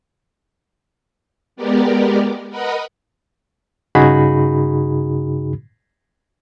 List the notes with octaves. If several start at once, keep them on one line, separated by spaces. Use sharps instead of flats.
G#3 B3 G4 A#4 D5
A#4 B4 D#5 F#5 B5
G2 C#3 D#4 F#4 G#4 B5